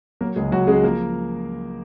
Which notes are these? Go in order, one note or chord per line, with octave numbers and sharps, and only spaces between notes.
F#3 A#3 A#4
C#2 G#3 G#4
C#2 F#3 F#4
C#3 G#3 G#4
F3 A#3 A#4